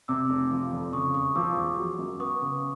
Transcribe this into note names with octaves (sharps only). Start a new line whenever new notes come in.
C3 D6 E6
F1
F3
F2
C#3 C#6 D#6
E1 C#6 D#6
F3 D6 E6
E2
F#3
F#2
B3 C#6 D#6
C#3